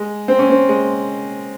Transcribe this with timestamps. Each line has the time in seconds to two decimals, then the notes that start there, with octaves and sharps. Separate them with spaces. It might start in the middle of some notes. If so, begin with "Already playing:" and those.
Already playing: G#3
0.28 C4
0.39 C#4
0.50 C4
0.69 G#3